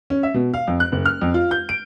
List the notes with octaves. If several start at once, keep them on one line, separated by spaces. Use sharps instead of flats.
C#4
E5
B2
F5
F2
F#6
F#1
F6
F2
F4
G6
D7